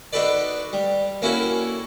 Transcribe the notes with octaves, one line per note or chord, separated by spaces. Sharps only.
D4 D#4 F#4 A4 B4 D5
G3
A#3 C#4 E4 F#4 A4